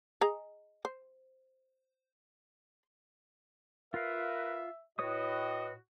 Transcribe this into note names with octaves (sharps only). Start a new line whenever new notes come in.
G#4 D#5 A#5
C5
F4 A#4 B4 E5 F5
A2 F#4 B4 C#5 D#5 D#6